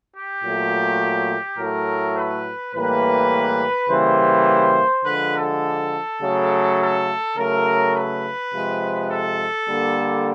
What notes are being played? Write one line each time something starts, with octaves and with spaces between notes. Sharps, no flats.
G4
A#2 F#3 A3
A2 F#3 A3 A#4
B4
A2 E3 G3 A#3 B4
C#3 E3 G3 A#3 C5
D3 F3 G#3 B4
A4
C#3 F#3 A3
A4
C#3 F#3 A3 A#4
B4
C3 F3 G#3
A4
D3 G3 A#3